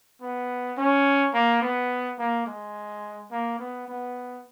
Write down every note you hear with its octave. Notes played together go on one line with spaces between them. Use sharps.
B3
C#4
A#3
B3
A#3
G#3
A#3
B3
B3